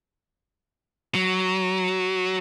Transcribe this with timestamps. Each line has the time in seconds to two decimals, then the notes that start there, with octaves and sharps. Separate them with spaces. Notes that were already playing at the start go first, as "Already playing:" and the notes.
1.15 F#3